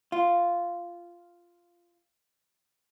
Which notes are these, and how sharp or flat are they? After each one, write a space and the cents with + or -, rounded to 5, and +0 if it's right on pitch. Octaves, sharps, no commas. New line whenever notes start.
F4 -5